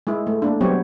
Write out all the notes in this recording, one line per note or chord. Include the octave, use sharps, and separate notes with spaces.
G#3 E4
A3
A3 A#3 D4
F#3 G3 B3 C4 G4 C#5